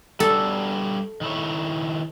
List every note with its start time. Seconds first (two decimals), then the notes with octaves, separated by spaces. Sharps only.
0.20 G3 D4 F#4 A4
1.21 D#3 E4 C#5